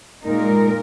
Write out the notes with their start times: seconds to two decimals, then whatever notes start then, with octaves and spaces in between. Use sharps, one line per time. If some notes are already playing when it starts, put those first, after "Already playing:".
0.24 A#2 G#3 D#4 A#4